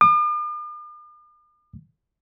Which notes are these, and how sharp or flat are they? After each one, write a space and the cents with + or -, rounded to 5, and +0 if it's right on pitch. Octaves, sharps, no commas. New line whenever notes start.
D6 +45